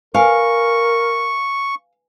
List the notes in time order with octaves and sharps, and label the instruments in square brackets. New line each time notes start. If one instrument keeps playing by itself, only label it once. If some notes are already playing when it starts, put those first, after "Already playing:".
[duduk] A#4 [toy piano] B4 G#5 [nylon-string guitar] F5 [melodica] C#6